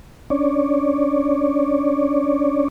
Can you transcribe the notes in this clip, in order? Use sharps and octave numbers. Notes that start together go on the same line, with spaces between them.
C#4 D4 C#5 D5